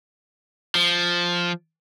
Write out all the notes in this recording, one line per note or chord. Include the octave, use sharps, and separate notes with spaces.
F3